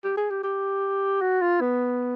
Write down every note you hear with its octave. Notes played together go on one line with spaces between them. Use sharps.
G4
G#4
G4
G4
F#4
F4
B3